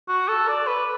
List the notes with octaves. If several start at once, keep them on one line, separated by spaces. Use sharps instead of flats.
F#4
A4
D5
B4